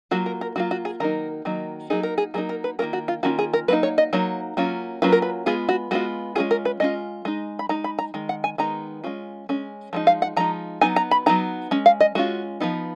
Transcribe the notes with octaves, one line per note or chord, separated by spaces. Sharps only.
F#3 A#3 F4 F#4
A#4
A#4
F#3 A#3 F4 F#4
F#4
G#4
D#3 F#3 A#3 D#4 A#4
D#3 F#3 A#3 D#4
F#3 A#3 D#4 G#4
A#4
G#4
F#3 A#3 D#4 G#4
A#4
B4
D#3 A#3 C#4 F4 A#4
F#4
F4
D#3 A#3 C#4 F4 F#4
G#4
A#4
F#3 A#3 D#4 B4
C#5
D#5
F#3 A#3 D#4 C#5
F#3 A#3 C#4 F4
F#3 A#3 C#4 F4 B4
A#4
B4
G#3 B3 F4 G#4
F#4
G#3 B3 F4 F#4
G#3 C#4 F4 G#4
A#4
B4
G#3 C#4 F4 D#5
G#3 D#4
B5
G#3 D#4 A#5
B5
A#5
D#3 G#3
F#5
G#5
D#3 G#3 B3 D#4 A#5
G#3 C#4 F4
G#3 C#4
F3 G#3 D#4
F5
F#5
F3 G#3 D#4 A#5
F#3 B3 D#4 G#5
A#5
B5
F#3 B3 D#4 A#5
G#3 C#4
F5
D#5
G#3 C#4 F4 F#4
F3 B3 D#4